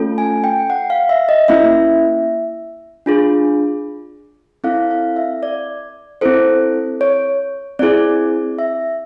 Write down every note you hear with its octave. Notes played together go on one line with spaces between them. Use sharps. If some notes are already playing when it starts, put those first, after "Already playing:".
Already playing: A3 C#4 F4 A4
G#5
G5
F#5
F5
E5
D#5
A#3 C#4 E4 E5
D4 F4 G#4
C4 E4 A4 F5
F5
E5
D5
C4 E4 A4 C5
C#5
C4 E4 G#4 D5
E5